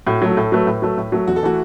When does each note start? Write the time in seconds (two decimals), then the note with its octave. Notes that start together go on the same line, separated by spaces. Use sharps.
0.06 A2 F#4
0.22 F#3 A3
0.31 F#4
0.37 A2 A4
0.52 F#3 A3 B4
0.67 A2
0.82 F#3 A3
0.98 A2
1.12 F#3 A3
1.27 E2 F#4
1.36 A4
1.43 E3 A3 F#4